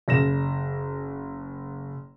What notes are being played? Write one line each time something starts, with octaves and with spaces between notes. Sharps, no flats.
F#1 A#6 E7